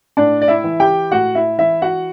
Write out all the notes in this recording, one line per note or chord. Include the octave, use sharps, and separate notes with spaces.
A2 D4 D5
D5
E4 E5
E3
G4 G5
A2 F#4 F#5
E4 E5
E3 E4 E5
F#4 F#5